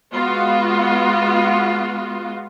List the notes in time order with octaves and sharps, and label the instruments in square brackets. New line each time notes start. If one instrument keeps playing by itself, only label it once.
[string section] G#3 B3 F4 F#4